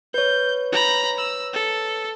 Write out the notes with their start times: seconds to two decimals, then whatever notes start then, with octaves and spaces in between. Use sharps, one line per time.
0.14 B4 C#5 G6
0.72 A#5 B5
1.18 E6
1.53 A4